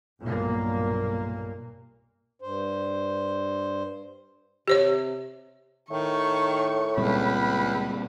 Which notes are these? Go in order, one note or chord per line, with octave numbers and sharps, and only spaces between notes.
B1 G2 A#2 A#3
G2 C5
C3 G4 C5 C#5
A2 D#3 C#6
C#2 A#2 G3 C4 B5